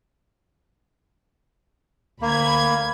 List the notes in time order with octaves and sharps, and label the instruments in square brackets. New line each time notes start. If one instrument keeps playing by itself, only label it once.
[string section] D2 B5 G#6 [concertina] A#3